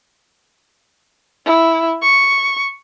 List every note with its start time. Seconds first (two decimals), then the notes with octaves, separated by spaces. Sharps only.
1.46 E4
2.02 C#6